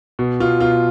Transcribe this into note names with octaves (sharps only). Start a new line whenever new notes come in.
B2
B2 F4
B2 F4